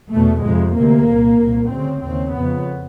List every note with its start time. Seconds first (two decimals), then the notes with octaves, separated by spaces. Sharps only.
0.11 E2 B2 A3
0.43 F2 C3 G#3
0.75 D2 C3 A#3
1.07 C2 A#2
1.39 C2 A#2
1.71 D2 C#3 C4
2.02 D#2 C#3 C4
2.35 F2 C#3 B3